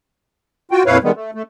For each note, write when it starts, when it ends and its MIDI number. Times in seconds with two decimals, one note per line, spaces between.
0.71 0.83 65
0.71 0.83 66
0.71 0.83 79
0.86 0.98 41
0.86 0.98 46
0.86 0.98 64
0.86 0.98 71
0.86 0.98 73
0.86 0.98 77
1.04 1.12 51
1.04 1.12 55
1.04 1.12 56
1.04 1.12 59
1.15 1.31 57
1.34 1.42 57